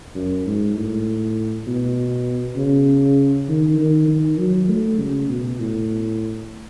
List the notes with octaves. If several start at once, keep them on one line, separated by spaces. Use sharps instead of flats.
F#2
G#2
A2
B2
C#3
D#3
D#3
D#3
F#3
A3
C#3
B2
A2